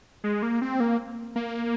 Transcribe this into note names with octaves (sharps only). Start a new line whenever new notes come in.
G#3
A#3
C4
A#3
A#3